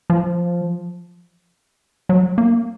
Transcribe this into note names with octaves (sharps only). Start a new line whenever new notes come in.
F3
F#3
A#3